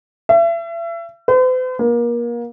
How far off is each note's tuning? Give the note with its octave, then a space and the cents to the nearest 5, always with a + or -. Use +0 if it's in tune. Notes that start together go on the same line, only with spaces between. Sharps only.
E5 +35
C5 -45
A#3 +30